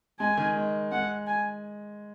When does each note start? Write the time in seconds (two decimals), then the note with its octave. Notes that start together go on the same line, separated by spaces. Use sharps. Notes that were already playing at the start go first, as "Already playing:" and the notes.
0.19 G#3 G#5
0.37 D#3
0.56 G#3
0.92 G#3 F#5
1.27 G#5